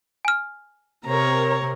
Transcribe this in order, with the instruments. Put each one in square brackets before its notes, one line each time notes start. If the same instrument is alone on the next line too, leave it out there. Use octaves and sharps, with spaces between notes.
[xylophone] G#5 F6
[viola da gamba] C3 [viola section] C4 A#4 [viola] C#5 A#5